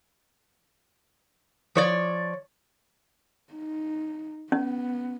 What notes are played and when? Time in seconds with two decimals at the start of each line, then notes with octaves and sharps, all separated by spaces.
1.75 F3 C#5 D5
3.54 D#4
4.52 B3 C#4